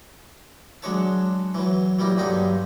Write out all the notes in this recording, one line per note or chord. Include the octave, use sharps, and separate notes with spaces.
F#3 G#3 D4 C#5 E5 A5
E3 F#3
F#3 G3 A#3 E4
G2 D3 F#3 D#4 D#5